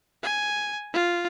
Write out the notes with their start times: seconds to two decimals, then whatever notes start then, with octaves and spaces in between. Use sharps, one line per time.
0.23 G#5
0.93 F4